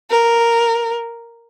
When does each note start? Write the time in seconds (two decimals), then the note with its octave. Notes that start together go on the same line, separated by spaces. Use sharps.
0.11 A#4